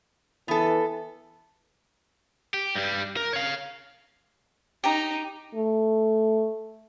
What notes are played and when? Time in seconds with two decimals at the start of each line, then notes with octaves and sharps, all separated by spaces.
0.48 E3 B3 A4
2.54 G4
2.75 G2 G3
3.17 A#4
3.33 C#5 F5
4.84 D#4 G4 A#5
5.55 A3